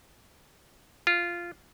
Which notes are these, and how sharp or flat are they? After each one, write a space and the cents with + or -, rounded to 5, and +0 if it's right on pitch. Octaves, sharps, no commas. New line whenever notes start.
F4 -10